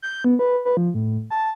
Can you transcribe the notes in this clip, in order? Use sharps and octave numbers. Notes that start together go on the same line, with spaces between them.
G6
B3
B4
B4
F3
A2
A5